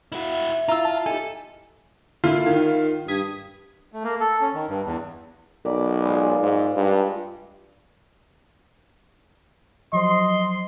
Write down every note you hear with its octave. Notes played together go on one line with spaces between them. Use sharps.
E4 F#4 E5
E4 F4 A#5 E6
A5
D#4 G4 A4 G#5
D3 A#3 E4 F4
D#3
G2 D#6 G#6 B6
A3
A#3
A4
C#4
D#3
G2
E2
B1 A#4 B4 D5
G#3 F4
G#2
G2
F3 F#3 C5 D#5 C6